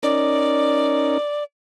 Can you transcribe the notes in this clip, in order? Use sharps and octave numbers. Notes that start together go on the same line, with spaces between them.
C#4 D#4 A#4 D5